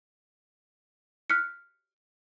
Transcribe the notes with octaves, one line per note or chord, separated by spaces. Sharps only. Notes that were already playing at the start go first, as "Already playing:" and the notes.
F6 F#6 B6 C#7